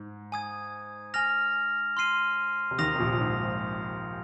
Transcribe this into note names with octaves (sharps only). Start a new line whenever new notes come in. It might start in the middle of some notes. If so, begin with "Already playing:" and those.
Already playing: G#2
G#5 D#6 G#6
G#5 F6 A#6 F7
C6 F6 C7 D#7
C3
D#2 D#3 D#6 A#6 F7
C3
A#1 A#2
G#2